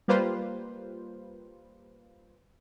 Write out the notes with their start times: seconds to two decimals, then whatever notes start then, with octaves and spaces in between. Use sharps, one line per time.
0.08 G3 A#3 F4 B4 C5